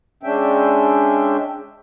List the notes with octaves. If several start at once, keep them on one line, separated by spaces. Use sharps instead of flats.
G#3 C#4 D4 E5 G5